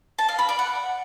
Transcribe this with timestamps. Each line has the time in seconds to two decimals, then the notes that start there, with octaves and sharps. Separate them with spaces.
0.18 A5
0.29 F5
0.39 B5
0.49 D5
0.59 F#5